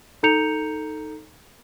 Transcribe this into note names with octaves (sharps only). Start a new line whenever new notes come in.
D#4 A4 A#5 G6 C#7 F7